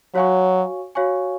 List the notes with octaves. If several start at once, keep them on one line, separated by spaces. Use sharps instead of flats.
F#3 F#4 C#5 F5 G#5 C#6
F#4 C#5 F5 G#5 C#6